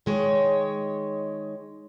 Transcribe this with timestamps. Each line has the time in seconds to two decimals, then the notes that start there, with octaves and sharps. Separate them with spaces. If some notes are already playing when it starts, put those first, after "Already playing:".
0.06 D#3 G#3 C#5